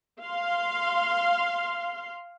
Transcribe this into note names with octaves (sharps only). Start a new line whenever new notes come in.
F5 C6